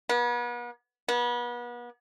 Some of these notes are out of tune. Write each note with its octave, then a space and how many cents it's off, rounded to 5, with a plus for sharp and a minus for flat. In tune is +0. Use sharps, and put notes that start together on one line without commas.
B3 -40
B3 -35